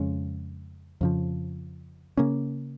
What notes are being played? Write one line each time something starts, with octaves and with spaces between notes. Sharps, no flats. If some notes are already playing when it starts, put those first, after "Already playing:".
Already playing: F2 C#3 G#3 C#4
F2 C#3 F3
C#3 A#3 C#4